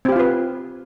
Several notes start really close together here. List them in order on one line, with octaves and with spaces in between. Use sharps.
C4 G4 F5 F4 B4